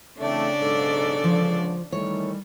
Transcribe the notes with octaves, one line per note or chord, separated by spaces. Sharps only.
C#3 E3 A3 C4 D4 D5
B1 G#2 A4
C#2 D3 F3 F4
D#3 E3 G3 A3 C#5